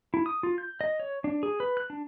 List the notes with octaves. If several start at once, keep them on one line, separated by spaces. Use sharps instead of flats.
E4
D#6
F4
G6
D#5
C#5
D4
G#4
B4
F#6
D4